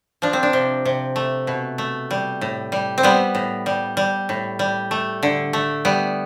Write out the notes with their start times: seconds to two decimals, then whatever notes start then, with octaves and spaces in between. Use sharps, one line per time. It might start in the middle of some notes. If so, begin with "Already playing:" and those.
0.22 F3 D4
0.33 C4
0.43 D4
0.53 C3
0.85 C3
1.16 A3
1.47 B2
1.78 A3
2.11 G3
2.41 A2
2.72 G3
2.98 C4
3.03 G3 B3
3.35 A2
3.66 G3
3.97 G3
4.29 A2
4.59 G3
4.91 A3
5.23 D3
5.53 A3
5.85 G3 B3